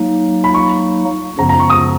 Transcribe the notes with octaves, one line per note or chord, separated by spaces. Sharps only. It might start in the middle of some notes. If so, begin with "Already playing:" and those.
Already playing: F#3 A#3 D#4
B5
C#6
F#2 C#3 F3 B3 A#5
A#5
C#6
D#6